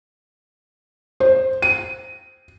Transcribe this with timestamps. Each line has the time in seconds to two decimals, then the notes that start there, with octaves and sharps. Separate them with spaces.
1.20 C5
1.62 D#7